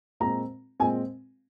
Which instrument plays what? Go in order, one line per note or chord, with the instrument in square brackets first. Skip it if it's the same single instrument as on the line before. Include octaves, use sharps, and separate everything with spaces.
[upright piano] A#2 G#3 C4 A#5
A#2 G#3 C4 G#5